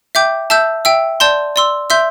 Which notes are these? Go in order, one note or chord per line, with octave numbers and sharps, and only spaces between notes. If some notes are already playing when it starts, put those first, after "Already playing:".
E5 G5 D6 G6
E5 A5 E6 G6
E5 G5 E6
D5 A5 C6 G6
D5 C6 E6
E5 C6 E6 G6